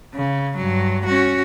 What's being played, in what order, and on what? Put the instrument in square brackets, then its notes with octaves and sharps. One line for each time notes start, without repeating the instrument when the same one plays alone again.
[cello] C#3
G2 F#3
C#4 F#4